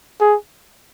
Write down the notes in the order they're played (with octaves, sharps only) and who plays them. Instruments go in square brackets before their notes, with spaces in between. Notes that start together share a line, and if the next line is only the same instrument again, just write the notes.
[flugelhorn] G#4